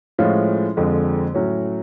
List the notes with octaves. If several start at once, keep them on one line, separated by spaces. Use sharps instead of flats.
A2 F3 G#3 C#4 F4
F2 D3 F3 G#3
A2 F#3 C#4